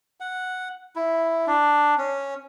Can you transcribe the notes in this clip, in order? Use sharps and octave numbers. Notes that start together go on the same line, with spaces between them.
F#5
E4
D4
C#4